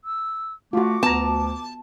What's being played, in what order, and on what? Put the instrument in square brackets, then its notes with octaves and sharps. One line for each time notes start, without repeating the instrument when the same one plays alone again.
[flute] E6
[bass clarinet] A3 [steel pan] F4 F#4 [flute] D6
[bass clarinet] D2 [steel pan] B3 A#5 [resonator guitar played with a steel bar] A5